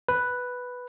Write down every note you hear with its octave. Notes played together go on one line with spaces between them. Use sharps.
B4